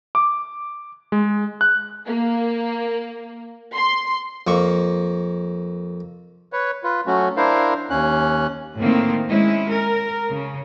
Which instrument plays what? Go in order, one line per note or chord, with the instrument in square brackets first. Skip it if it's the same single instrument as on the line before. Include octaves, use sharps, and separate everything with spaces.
[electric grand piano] D6
G#3
F#6
[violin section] A#3
C6
[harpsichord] F2 A#3 C#6
[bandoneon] B4 C#5
F4 B4
F#3 A3 C#4 F#4
D4 E4 A#4 C5 F5
D#2 C#4 F#6
[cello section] A2 D#3 A#3 C4
G#3 C#4 E4
A#4
C#3